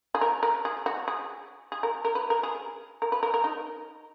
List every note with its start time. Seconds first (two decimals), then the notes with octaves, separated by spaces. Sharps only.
0.15 G#4
0.21 A#4
0.43 A#4
0.65 G#4
0.86 F#4
1.08 G#4
1.72 G#4
1.83 A#4
2.05 A#4
2.15 B4
2.30 A#4
2.43 G#4
3.02 A#4
3.12 B4
3.23 A#4
3.34 A#4
3.44 D#4